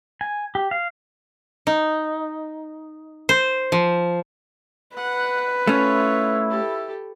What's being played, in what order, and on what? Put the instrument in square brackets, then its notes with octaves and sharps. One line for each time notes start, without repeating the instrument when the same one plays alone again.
[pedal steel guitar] G#5
G4
F5
[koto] D#4
C5
F3
[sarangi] B4 [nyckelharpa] F#5
[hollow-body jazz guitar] A3 C#4 [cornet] E4 [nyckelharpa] F4 C#5
[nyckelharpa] G4 A4